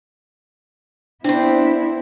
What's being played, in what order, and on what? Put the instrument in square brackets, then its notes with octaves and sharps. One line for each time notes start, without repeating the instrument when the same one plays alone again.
[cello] B3 E4 [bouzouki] C4 C5 [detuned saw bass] D4